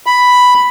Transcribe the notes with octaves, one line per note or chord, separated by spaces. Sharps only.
B5